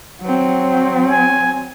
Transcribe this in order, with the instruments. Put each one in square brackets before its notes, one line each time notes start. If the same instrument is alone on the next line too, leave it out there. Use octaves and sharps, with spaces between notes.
[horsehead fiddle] F#3 C4
[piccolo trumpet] G#5